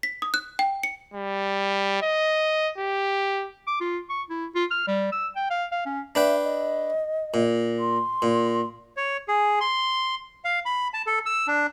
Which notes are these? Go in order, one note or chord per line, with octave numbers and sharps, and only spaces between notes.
B6
D#6
F#6
G5
C#7
G3
D#5
G4
D6
F4
C#6
E4
F4
F6
G3
E6
G5
F5
F5
C#4
D4 B4 E5 G5
D#5
A#2
C6
A#2
C#5
G#4
C6
F5
B5
A5
A4
E6
D4